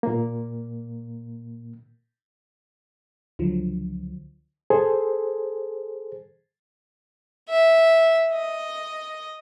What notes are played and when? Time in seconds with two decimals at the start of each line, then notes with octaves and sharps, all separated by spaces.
0.03 A#2 A#3
3.39 C#2 D3 F3 F#3
4.70 G#4 A4 C5
7.49 E5
8.32 D#5